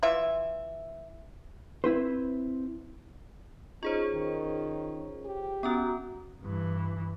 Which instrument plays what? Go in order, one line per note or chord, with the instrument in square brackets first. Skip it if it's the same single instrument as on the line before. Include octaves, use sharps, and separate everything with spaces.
[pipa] E3 F4 E5
[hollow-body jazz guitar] C4 E4 B4 C5
[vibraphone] C#4 C#5 [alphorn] D#4 [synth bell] F4 G#4 C5
[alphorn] D#3
G4
[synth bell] B3 C#4 [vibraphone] F#4 A#5 D#6
[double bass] G2 E3